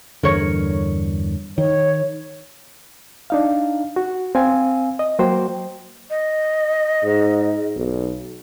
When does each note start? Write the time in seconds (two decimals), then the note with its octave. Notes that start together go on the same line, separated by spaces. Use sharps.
0.23 E2 G2 D3 A#4 C#5
1.58 D#3 C#5
3.30 D4 D#4 F5
3.96 F#4
4.35 C4 F5 G#5
4.99 D#5
5.19 F#3 A#3 F#4 C5 G5
6.10 D#5
7.04 G#2
7.76 B1